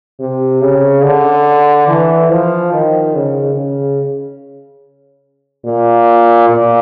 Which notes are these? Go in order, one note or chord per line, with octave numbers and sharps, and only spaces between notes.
C3
C#3
D3
E3
F3
D#3
C#3
C#3
A#2
A#2